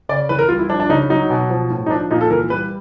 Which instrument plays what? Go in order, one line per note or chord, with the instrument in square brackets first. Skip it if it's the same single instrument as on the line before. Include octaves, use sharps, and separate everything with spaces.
[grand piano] C#3 D5
E3 B4
A#4
G3 F4
E4
F3 D4
D4
C#3 D#4
F#3 D#4
B2
F3
A2
D#4
F3 D4
A#2 D#4
A4
E3 A#4
G3 B4